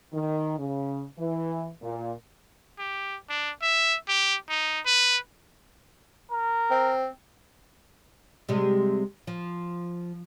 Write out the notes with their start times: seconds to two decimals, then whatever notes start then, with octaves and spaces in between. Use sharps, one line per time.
0.12 D#3
0.58 C#3
1.19 E3
1.82 A#2
2.78 G4
3.29 D4
3.62 E5
4.08 G4
4.49 D#4
4.86 B4
6.32 A#4
6.71 C4
8.49 C3 G3 G#3
9.27 F3